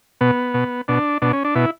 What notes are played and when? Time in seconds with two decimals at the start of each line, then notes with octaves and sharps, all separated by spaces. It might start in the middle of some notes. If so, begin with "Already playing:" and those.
0.21 B2 B3
0.54 B2
0.88 B2 D4
1.22 B2 D4
1.33 C#4
1.44 D4
1.55 B2 E4